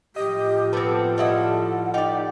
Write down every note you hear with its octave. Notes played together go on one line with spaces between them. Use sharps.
A2 F3 G4 D#5
B3 C4 A4
G3 E4 D#5 F#5
D#4 G4 D5